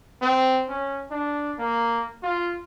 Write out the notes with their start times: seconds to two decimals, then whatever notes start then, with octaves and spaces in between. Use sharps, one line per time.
0.22 C4
0.69 C#4
1.11 D4
1.59 A#3
2.23 F4